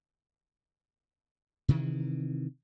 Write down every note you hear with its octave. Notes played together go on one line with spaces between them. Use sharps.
C3 D#3 E3